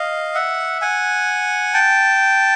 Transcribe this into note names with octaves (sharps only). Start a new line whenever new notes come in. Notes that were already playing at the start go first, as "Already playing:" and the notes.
Already playing: D#5 F5
E5 F#5
F#5 G#5
G5 A5